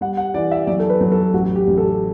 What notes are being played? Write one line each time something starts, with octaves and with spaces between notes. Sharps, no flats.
G3 F#5
F#5
E3 D5
E5
F#3 D5
A4
B4
F#3
A4
A1 F#4
G4
A1
A4